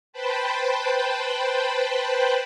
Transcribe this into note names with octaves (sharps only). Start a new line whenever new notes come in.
B4 C5 G5 A5 B5